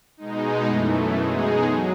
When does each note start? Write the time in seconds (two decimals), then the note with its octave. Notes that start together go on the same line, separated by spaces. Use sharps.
0.17 B2 G#3 D#4
0.66 F#2 E3 A3
1.14 B2 G#3 D#4 G#4
1.64 F#3